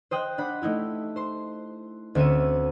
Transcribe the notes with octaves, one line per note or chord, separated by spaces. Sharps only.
C5 D#5 G5 F#6
D4 F#5 B5
A3 D#4 E4 G4
C5 C6
D2 C4 C#4 E5 C#7 D#7